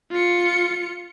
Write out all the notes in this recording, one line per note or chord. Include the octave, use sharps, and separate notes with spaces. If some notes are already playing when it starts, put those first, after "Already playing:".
F4 C#7